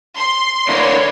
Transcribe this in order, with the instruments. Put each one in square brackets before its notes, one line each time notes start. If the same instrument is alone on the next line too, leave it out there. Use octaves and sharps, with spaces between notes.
[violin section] C6
[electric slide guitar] D3 A#3 E4 [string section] B4 C#5 D5